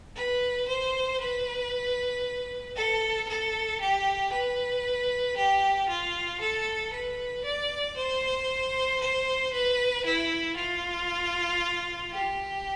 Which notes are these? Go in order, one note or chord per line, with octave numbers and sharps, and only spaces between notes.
B4
C5
B4
A4
A4
G4
B4
G4
F4
A4
B4
D5
C5
C5
B4
E4
F4
G4